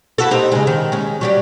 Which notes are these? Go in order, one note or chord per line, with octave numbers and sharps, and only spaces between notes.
E4 F#4 A4
D#4 G4 C5
C#3 G#3
D#3
G#3 C#4
F#3 G3 G4